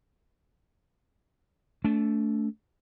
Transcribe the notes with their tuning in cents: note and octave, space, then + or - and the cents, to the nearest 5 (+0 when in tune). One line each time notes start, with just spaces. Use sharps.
A3 +0 D4 -40